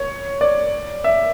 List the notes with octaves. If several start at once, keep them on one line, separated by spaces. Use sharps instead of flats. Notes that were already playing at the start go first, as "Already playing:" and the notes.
Already playing: C#5
D5
E5